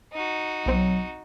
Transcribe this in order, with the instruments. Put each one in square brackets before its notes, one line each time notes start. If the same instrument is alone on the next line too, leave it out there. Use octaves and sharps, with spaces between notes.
[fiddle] D#4 F#4
[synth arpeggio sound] B1 B2 C4 [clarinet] F#3